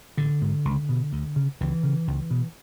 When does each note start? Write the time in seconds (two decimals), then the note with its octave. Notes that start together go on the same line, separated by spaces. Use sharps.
0.17 A1 D3
0.42 G#2
0.65 C#2
0.89 B2
1.13 D2
1.36 C#3
1.61 C#2 E3
1.83 C#3
2.07 C#2
2.31 B2